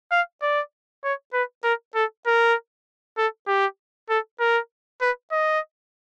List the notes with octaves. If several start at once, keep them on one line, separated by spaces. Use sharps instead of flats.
F5
D5
C#5
B4
A#4
A4
A#4
A4
G4
A4
A#4
B4
D#5